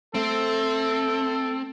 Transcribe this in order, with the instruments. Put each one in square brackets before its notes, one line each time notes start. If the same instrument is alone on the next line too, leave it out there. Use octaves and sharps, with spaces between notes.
[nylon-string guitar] A3 [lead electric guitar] C4 [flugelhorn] A4